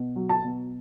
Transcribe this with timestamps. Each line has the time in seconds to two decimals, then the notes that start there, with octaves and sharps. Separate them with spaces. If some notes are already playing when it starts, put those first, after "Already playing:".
Already playing: B2
0.16 F#3
0.29 A5
0.44 B2